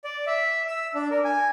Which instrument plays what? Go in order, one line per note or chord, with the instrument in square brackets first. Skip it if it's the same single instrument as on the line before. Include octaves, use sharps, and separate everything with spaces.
[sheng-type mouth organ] D5
E5
E6
D4
A#4
G#5